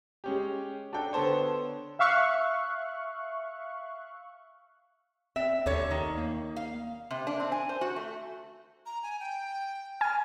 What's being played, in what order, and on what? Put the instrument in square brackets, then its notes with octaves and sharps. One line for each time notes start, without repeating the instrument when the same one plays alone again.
[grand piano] G#3 C#4 G4
D4 F#4 A4 G5
D3 B3 A4 C5 C#5
[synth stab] E5 F5 C#6 F#6
[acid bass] C4 [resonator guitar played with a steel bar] E5
[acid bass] D#2 [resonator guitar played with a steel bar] D3 A4 C#5
[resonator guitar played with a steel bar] D#3
[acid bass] A#3
[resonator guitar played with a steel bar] F5
C3
D4
C4
G#5
C5
F#4
A3
[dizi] A#5
G#5
G5
[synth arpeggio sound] G#5 [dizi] F6